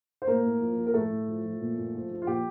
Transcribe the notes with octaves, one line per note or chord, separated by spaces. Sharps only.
C5
A2 A#3 A#4
A2
F3
F3
A#4
A2 A3 A4
A2
F3
F3
A#2
A#2
F3
F3
F4
A#2 G4